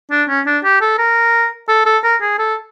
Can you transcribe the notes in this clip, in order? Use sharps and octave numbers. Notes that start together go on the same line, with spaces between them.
D4
C#4
D4
G4
A4
A#4
A4
A4
A#4
G#4
A4